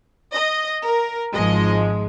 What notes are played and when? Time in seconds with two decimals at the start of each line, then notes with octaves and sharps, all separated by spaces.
0.33 D#5
0.83 A#4
1.33 G#1 G#2 F3 G#3 D#5